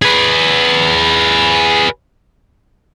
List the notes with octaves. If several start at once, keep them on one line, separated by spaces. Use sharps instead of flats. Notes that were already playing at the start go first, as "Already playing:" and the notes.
G#4 B4